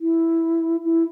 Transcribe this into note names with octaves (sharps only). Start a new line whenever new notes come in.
E4
E4